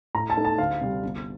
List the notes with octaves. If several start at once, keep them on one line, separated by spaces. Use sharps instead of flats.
A2 A#5
A5
A3 D#4
A5
D2 F5
C3 G3
G1